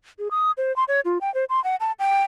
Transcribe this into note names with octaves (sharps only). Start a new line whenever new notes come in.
G#4
D#6
C5
C6
C#5
F4
G5
C5
C6
F#5
A5
G5